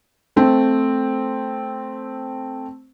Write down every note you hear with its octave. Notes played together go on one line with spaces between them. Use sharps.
A3 C4